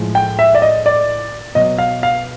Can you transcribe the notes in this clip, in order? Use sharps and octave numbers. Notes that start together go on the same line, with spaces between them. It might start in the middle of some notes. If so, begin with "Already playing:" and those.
Already playing: A2 F3 G#3
G5
E5
D5
D#5
D5
B2 F#3 D#5
F5
F5